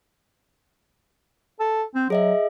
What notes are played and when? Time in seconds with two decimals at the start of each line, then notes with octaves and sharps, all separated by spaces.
1.60 A4
1.95 C4
2.10 F#3 G#4 D#5 E5